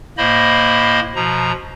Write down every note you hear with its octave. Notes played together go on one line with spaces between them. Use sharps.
A2 A#3 C5 D#5 B5
B2 F3 A#5